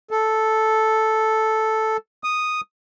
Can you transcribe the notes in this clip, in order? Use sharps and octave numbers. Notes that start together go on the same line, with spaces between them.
A4
D#6